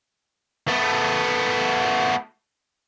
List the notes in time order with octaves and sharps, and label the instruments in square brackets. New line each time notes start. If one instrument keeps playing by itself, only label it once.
[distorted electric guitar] A3 B3